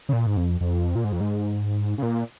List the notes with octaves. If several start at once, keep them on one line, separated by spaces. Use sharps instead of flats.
C#3
A#2
G#2
F2
F2
A#2
G#2
F2
G#2
C#3
A#2